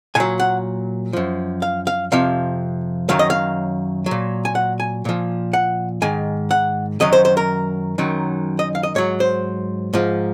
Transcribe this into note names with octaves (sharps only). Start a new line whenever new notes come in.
A#2 F#3 G#5
F#5
F#2 F3
F5
F5
F2 C3 F3 F5
F#2 D#3 F#3 F5
D#5
F5
F#3
A#2
G#5
F#5
G#5
A#2 F3
F#5
G#2 D#3 G#5
F#5
F#2 D#3 F#3 D#5
C5
C5
A#4
F#2 D#3 F#3
D#5
F5
D#5
G#2 F#3 C#5
C5
G#2 F3